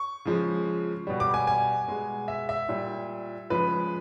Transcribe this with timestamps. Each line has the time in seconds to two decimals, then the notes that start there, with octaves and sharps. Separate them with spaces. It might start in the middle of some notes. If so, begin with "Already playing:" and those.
Already playing: C#6
0.25 C#3 F3 G#3
1.07 B2 G3
1.20 D6
1.34 G#5
1.47 G#5
1.88 B2 G#3
2.28 E5
2.49 E5
2.69 A#2 G3
3.50 C#3 F3 G#3 B4